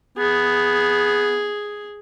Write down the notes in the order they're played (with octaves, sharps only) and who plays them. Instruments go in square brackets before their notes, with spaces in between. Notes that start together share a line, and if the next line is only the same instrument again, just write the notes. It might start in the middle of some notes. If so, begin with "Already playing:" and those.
[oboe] B3 [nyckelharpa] G#4